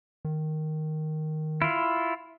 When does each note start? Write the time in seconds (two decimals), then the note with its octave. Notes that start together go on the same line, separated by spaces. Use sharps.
0.25 D#3
1.62 E4 F4